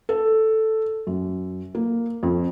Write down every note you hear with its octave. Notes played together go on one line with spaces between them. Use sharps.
A4
F#2
A#3
F2